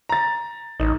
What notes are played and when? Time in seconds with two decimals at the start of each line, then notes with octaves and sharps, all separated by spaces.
0.09 A#5 A6
0.80 A1 D#4